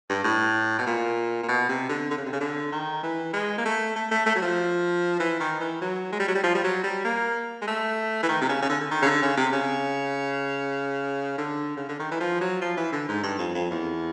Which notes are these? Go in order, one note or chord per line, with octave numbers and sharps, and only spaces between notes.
G2
A2
B2
A#2
A#2
B2
C3
D3
D3
C#3
C3
C#3
D3
D#3
E3
G#3
A#3
A3
A3
A3
A3
F#3
F3
E3
D#3
E3
F#3
G#3
G3
F#3
G3
F3
G3
F#3
G3
A#3
G#3
A3
E3
D#3
C3
C#3
C#3
D3
D3
D#3
C#3
D3
C#3
C3
C#3
D3
C#3
D3
D#3
E3
F3
F#3
F3
E3
D3
G#2
G2
F2
F2
E2